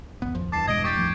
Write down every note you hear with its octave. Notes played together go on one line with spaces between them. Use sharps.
G#1 E2 B3
F#2 F3
D1 E2 G2 E3 A5 D6 C7
B2 G#3 D#5 G#6 D7
G4 C#6 G6 A6
A1 F3 A3